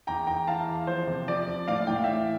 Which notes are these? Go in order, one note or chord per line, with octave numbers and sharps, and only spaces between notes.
E2 G5 A#5
E2 G5 A#5
E3 F5 A5
E2
F3 C5
C3
F3 D5
F3
A2 D5 F5
A2 G5
F5
E3 E5 G5